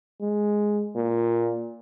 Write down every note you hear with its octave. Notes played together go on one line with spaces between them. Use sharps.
G#3
A#2